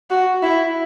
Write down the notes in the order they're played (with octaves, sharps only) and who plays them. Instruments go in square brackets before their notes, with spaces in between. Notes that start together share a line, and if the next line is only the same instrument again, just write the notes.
[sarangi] F#4
E4